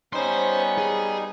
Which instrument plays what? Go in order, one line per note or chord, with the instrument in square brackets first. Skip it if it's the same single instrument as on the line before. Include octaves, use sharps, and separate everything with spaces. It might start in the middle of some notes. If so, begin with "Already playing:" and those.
[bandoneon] G3 D#4 [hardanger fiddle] B3 C#4 [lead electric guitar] C5 C6
[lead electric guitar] G#4